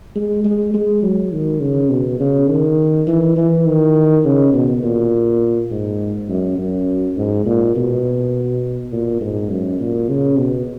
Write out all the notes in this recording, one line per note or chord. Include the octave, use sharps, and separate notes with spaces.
G#3
G#3
G#3
F#3
D#3
C#3
B2
C#3
D#3
E3
E3
D#3
C#3
B2
A#2
G#2
F#2
F#2
G#2
A#2
B2
A#2
G#2
F#2
A#2
C#3
B2